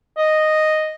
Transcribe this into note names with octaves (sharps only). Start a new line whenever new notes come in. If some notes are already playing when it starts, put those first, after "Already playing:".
D#5